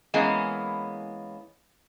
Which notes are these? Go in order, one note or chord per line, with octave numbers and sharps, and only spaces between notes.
E3 G#3 A#3 B3 C#4